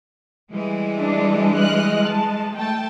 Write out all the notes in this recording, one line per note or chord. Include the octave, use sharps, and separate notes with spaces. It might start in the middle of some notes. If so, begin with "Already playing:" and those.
E3 G3 G#3
D4
D#5 F6 F#6
A5
A3 G5 A5